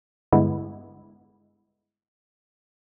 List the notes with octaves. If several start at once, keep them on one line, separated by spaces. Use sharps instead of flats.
G2 D3 G#3 B3 E4